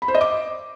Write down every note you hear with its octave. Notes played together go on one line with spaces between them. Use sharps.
B5
C5
D#5
D6